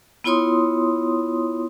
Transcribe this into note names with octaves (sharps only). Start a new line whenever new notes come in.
B3 E4 F4 C#5 C6 D#6